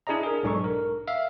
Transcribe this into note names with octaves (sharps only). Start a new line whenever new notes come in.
D4 E4 G#4 D5 D#5 A#5
G#4 A#4
B1 G#2 D4 D#4 A4 C#6
A#4
E5 F5